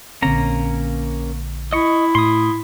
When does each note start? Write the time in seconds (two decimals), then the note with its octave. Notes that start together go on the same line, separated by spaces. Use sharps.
0.22 A#1 D3 A#3 C4 C#4 A#5
1.73 E4 D#5 C#6
2.15 A2 C6 D#6